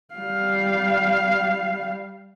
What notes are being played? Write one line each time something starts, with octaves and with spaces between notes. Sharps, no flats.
G3 F5